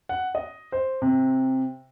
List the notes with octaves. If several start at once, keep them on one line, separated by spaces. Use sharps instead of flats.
F#5
D#5
C5
C3